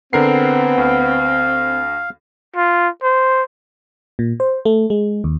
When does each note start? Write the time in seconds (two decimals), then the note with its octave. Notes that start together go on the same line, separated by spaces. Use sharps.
0.13 D3 B3 C4 A#4 C7
0.78 D2 F5
2.56 F4
3.03 C5
4.19 A#2
4.40 C5
4.65 A3
4.90 G#3
5.24 D#2